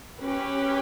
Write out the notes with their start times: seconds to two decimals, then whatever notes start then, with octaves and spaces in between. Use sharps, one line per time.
0.21 C#4 G4 B4